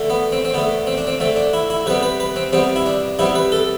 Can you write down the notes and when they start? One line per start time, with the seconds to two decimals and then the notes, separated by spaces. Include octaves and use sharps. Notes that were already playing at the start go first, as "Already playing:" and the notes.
Already playing: D3 A3
0.10 B3
0.32 C4
0.45 C4
0.54 D3 A3 B3
0.87 C4
0.98 D4
1.07 C4
1.20 D3 A3 C4
1.36 D4
1.53 E4
1.70 E4
1.86 C3 G3 B3 B4
2.03 B4
2.20 B4
2.36 C4
2.53 C3 G3 B3 C4
2.76 E4
2.86 D4
3.19 C3 G3 B3 E4
3.35 B4
3.52 A4